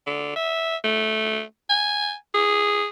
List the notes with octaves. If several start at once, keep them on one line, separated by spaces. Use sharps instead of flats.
D3
E5
A3
G#5
G#4